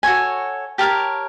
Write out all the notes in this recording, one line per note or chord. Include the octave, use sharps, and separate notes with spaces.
F#4 A4 C#5 G#5
G4 A#4 C#5 A5